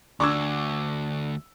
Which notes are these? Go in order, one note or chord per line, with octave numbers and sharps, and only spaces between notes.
D2 D4 C#6 D6 E6 G#6